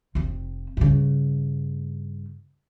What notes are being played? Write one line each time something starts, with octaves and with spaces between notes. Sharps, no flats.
F1 C4
G2 C#3